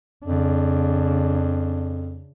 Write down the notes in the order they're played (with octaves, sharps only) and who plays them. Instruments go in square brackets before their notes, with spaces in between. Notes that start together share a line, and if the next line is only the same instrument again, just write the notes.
[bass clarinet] F2 [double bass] C#3 D4